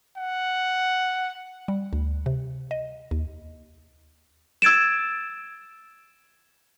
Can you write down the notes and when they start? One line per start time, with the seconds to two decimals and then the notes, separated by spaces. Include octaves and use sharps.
0.17 F#5
1.68 G3
1.93 D2
2.26 C3
2.71 D#5
3.11 D#2
4.62 E6 G#6 A6 D7 E7